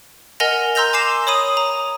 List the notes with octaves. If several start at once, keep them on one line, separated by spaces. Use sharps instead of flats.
A#4 D#5 F#5 G#5 A#6 F7
A#5 C6 E6 G6 A#6 F7
G#5 D6 C7 E7
C#5 B5 D#6 D#7
A#5